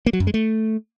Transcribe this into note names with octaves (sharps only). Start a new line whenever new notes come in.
A#3
F#3
F#2
G#3
A3